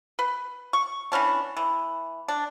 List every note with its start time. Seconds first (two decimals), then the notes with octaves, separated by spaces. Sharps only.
0.19 B4
0.73 C#6
1.12 E3 B3 C#4 D4
1.57 E3
2.28 D4